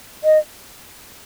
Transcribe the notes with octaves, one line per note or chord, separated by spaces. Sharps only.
D#5